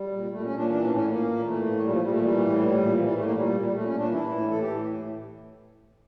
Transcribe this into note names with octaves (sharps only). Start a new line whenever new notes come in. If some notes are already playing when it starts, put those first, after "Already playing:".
Already playing: G3
A#2
A#2 A3
C#4
A#2
D4
E3 D4
C#4
A2
C#4
A#2 A#3
A#2
E3 A3
A2
A#2 G3
F3
A#2 G3
A3
E3 G3
A2
A#2 G3
A#2
E3 F3
G3
A2 A3
A#3
A#2 G3
A#2
G3
A#2 A3
C#4
A#2
D4
E3 E4
A2
E3 A4
G4
A2